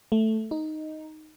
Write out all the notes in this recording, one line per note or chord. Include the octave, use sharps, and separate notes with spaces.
A3
D#4